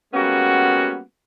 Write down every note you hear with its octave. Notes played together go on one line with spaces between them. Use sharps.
G3 G#3 A#3 B3 C#4 F#4